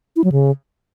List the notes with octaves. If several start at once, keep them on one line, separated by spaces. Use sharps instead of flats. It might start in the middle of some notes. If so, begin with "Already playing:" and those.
E4
F#3
C#3